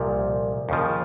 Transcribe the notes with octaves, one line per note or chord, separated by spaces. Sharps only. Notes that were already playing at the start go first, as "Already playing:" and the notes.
Already playing: C2 A#2 F3
D#2 C#3 F3